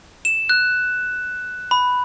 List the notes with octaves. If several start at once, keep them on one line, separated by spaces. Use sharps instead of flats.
E7
F#6
B5